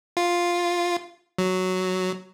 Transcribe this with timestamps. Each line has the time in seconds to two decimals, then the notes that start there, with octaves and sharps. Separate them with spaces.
0.17 F4
1.38 F#3